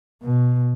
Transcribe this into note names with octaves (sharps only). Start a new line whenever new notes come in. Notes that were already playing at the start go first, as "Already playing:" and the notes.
B2